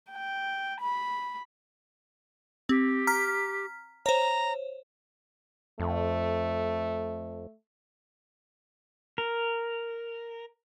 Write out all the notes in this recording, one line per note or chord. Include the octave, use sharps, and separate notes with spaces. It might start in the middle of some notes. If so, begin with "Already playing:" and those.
G5
B5
C4 G4
A#5 F6 B6
C5 C#5 A#5
F2 A3
A#4